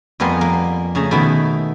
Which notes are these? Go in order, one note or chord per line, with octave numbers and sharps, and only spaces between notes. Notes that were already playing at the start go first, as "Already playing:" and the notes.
F2 G3 B3 A#4 G#5 C6
A#3
C#3 A3 G#4 A#5
B2 D#3 A3 B3 E4